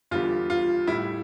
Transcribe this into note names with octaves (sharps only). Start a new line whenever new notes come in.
E2 D3 G3 F4
F4
A2 G3 E4